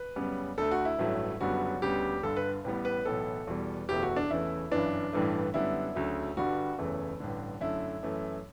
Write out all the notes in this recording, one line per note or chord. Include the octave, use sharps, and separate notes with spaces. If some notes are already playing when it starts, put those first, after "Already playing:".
Already playing: B4
F#2 C#3 G3 B3
D2 D3 A3 A4
F#4
E4
A1 G2 F#3 A3
F#1 F#2 D3 G3 B3 F#4
D2 C#3 G3 B3 G4
G1 G2 D3 A4
B4
A1 A2 G3 B3
B4
B1 A2 E3 B3 A4
E2 B2 G3
F#1 E2 B2 A3 G4
F#4
D4
E2 C#3 E3 A3 E4
G1 F#2 E3 D4
A1 G2 E3 A3
F#2 D3 G3 B3 E4
D2 C#3 F#3 A3
G1 G2 D3 G3 F#4
F#1 E2 C#3 E3 A3
A1 G2 D3
F#2 D3 A3 E4
F#2 E3 A3